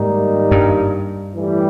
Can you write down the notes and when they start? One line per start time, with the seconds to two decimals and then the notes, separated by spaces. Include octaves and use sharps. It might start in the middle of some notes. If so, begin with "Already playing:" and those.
Already playing: G#2 D#3 G3 A#3 D#4
0.51 G2
1.36 A2 E3 G3